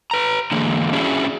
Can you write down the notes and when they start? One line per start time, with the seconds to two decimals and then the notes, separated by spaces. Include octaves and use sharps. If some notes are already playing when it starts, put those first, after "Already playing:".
0.11 B4 A#5
0.52 D3 E3 G#3 A#3
0.93 C#4 D4 E4 F#4 G#4